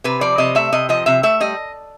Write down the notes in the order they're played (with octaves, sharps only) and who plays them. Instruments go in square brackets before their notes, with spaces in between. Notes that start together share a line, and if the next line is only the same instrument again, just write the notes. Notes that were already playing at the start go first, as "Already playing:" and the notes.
[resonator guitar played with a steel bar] C3 B4
F3 D5
C3 D#5
A3 E5
C3 D#5
F3 D#5
C3 E5
A3 E5
G3 D#5